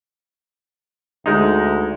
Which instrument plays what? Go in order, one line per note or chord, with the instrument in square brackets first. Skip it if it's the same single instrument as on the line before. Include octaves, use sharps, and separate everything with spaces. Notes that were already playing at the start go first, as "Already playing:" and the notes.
[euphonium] D2 [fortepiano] G#3 D#4